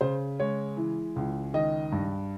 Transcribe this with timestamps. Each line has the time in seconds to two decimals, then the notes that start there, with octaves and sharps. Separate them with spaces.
0.01 C#3 C5
0.39 G#3 C#5
0.77 E3
1.16 C#2
1.54 D#3 D#5
1.92 G2